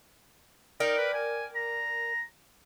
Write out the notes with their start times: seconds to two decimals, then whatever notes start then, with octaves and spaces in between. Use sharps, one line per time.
0.80 D#4 A#4 D5 G5
0.97 B4
1.14 G#5
1.55 A#5